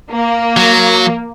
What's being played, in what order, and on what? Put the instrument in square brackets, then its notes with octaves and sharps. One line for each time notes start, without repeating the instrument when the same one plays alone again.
[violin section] A#3
[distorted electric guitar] F#3